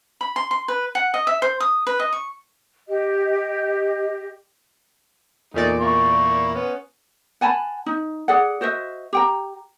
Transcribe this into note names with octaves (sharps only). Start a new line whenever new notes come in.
B5
C6
C6
B4
F#5
D#5
E5
C5
D#6
B4
D#5
C#6
G4 D#5
E2 A#2 A3 D#4 D5
A#3 E4 C#6
B3 C#4
F#5 G#5 A5 B5
D#4
G#4 D5 F#5
F#4 C5 D#5 E5
G4 G5 A#5